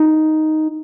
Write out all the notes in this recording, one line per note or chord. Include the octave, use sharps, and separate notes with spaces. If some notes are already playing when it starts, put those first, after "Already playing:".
Already playing: D#4